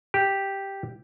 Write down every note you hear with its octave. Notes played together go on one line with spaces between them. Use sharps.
G4